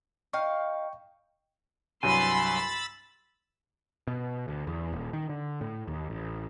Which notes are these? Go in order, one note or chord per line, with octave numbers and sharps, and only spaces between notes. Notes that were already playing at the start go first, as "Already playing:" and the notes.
D#4 F5 G5 C#6
C2 G2 F#3 G#5 B5 C6 E6 A6
B2
D2
E2
D#1
D#3
D3
A2
D#2
A1